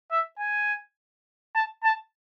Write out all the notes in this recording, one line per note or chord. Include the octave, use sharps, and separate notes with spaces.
E5
G#5
A5
A5